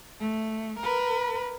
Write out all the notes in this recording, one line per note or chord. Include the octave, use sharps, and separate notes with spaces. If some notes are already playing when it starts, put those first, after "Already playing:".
A3
A#4 B4